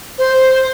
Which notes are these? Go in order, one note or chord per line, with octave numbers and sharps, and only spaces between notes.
C5